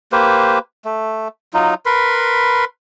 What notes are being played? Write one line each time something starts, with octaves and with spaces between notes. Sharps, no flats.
A#3 G4 B4 C5
A3
F#3 D#4 F4
A#4 B4 B5 C6